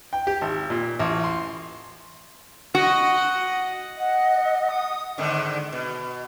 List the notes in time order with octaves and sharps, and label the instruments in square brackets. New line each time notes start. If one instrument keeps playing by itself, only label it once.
[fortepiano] G5
G4
G#1
A#2
A1
C6
[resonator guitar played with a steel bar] F#4 [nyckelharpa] D#5 F#5
[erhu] D#5 [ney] F#5
[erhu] D#6
[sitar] G#2 D3 D#3
B2